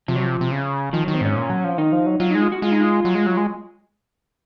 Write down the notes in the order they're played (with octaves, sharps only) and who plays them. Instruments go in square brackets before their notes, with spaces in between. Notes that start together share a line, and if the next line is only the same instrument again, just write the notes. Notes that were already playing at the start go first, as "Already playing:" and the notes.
[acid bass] C3 [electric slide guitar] F3
[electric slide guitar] F#3
F3
[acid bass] C3
C#3
[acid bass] D#3 [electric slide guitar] F3
[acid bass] D#3 [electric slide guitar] F#3
[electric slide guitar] C4
[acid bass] G#2 [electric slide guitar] C#4
[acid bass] A#2
F#3
F3
[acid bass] D#3 [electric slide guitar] D#4
[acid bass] F3
F#3
[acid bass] F#3 [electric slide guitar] F4
[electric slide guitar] D#4
[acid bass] G#3
[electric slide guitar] F4
F#4
[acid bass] G#3 [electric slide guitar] F4
[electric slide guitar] D#4
F4
[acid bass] F#3
G#3
F#3
G#3